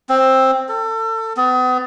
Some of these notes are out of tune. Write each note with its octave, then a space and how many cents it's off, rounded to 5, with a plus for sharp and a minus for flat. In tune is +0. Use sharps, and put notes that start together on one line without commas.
C4 +10
A4 +30
B3 +40